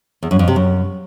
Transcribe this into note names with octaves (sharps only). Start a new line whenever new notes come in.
E2
F#2
F2
C3
F#2